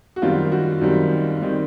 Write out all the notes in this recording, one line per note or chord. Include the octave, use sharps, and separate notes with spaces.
F#4
F#2 D#3 G3 C4 F4
F#4
F#2 D#3 G3 C4
D#3 G3 C4